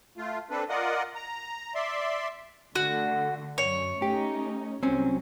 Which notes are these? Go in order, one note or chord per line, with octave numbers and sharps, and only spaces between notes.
A3 F4
C4 D4 A4 B4
F4 A#4 D5 D#5 F#5
A#5
D5 E5 C6
D3 A3 F#4
F#2 C#5
A3 C#4 D#4 G4
C2 F#3 C4 C#4